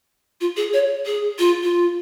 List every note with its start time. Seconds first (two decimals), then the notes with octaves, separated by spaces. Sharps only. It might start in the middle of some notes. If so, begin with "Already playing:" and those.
0.41 F4
0.57 G#4
0.73 C#5
1.06 G#4
1.39 F4
1.63 F4